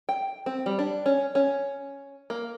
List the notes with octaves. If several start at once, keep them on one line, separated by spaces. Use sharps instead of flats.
G5
C4
G3
D4
C#4
C#4
A#3